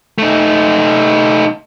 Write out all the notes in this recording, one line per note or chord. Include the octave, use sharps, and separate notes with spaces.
A3 D#4